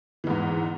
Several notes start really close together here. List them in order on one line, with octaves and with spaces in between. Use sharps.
E3 E2 G#2